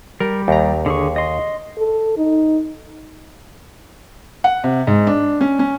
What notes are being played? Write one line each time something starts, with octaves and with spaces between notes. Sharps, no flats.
G3 A#4
D#2 A#5
D3 G#4 C#6
D#5 C6
A4
D#4
F#5
C3
G#2
D4
C#4
C#4